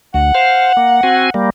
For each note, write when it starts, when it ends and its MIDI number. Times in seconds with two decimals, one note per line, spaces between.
0.14 0.32 38
0.14 1.31 78
0.35 0.72 72
0.35 0.72 77
0.77 1.01 58
1.03 1.30 60
1.03 1.30 66
1.03 1.30 80
1.34 1.50 55
1.34 1.50 58